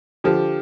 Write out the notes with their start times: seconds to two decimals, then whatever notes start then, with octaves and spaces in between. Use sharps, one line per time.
0.24 D3 F3 G4